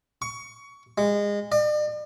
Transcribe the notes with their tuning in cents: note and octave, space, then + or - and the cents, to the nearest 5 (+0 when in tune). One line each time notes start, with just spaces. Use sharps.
C#6 +20
G#3 -25
D5 +45